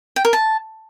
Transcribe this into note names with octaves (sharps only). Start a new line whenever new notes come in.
G5
A#4
A5